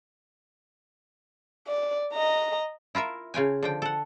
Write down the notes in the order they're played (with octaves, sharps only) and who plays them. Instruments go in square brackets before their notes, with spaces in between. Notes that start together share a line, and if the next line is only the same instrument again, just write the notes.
[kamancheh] D5
D#5 A#5
[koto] E4 F4 A#4 E5
C#3 F4 G5 G#5
D3 F3 G5
A4 F#5